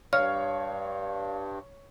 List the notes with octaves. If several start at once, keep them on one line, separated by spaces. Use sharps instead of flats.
G2 C#5 F5 F6